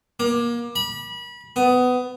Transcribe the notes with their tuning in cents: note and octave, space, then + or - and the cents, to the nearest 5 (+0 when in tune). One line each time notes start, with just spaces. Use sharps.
A#3 +30
B5 -30
B3 +20